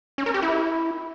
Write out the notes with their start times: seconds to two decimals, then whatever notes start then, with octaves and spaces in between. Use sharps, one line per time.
0.18 C#4
0.26 A#4
0.34 G4
0.42 E4